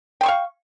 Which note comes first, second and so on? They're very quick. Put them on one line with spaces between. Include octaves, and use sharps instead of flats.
G5 C6 C#6 F5